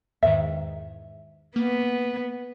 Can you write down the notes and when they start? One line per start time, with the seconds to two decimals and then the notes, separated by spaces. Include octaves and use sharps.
0.23 E2 G#2 D#3 E5
1.56 A#3 B3